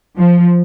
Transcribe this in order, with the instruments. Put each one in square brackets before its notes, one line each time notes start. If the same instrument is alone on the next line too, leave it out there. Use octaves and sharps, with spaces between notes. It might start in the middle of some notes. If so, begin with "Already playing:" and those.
[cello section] F3